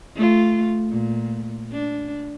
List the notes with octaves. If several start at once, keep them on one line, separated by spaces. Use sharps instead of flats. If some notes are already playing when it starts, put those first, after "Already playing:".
A3 F4
A#2
D4